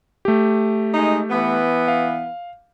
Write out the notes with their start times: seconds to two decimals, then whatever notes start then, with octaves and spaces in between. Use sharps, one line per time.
0.25 A3 G4
0.94 G#3 D#4
1.30 E3 B3
1.88 F5